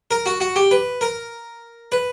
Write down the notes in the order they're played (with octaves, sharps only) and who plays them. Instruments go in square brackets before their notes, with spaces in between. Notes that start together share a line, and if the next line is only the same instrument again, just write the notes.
[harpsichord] A#4
F#4
F#4
G4
B4
A#4
B4